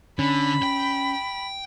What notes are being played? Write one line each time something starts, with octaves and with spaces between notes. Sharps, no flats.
D3 C#4 B5
G5